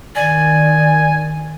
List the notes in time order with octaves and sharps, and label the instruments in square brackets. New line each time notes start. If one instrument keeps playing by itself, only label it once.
[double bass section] D#3 [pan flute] D5 [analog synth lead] G#5